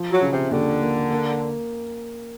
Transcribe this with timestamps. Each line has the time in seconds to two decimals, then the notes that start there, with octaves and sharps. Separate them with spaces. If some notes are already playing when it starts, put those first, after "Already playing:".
Already playing: F3
0.11 F#3
0.21 C#3
0.32 C3
0.51 D#2 D3
0.82 A#3
1.11 A#3